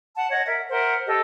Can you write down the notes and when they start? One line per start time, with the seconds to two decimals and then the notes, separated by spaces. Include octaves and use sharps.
0.16 F#5 A5
0.30 C#5 D#5 F#5
0.45 A#4 E5
0.70 A#4 C5 E5 F#5
1.07 G4 A4 D#5